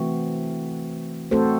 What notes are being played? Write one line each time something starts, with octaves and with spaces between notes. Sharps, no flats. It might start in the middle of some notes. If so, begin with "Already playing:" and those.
Already playing: E3 A3 C4 F#4
A3 C4 F#4 A4 C5